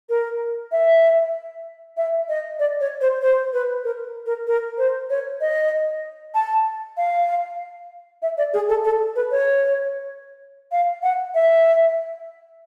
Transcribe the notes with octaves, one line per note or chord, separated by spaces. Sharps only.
A#4
E5
E5
D#5
D5
C#5
C5
C5
B4
A#4
A#4
A#4
C5
C#5
D#5
A5
F5
E5
D5
G#4
A4
A4
B4
C#5
F5
F#5
E5